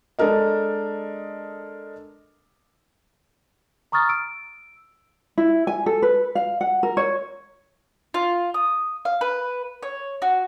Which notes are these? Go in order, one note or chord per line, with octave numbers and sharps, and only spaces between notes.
G#3 D4 A4 A#4 D#5
A#5 C#6 D#6 F6 A6
E6 D7
E4
G#5
A4
B4
F5
F#5
A#4
C#5
F4
D#6
F5
B4
C#5
F#4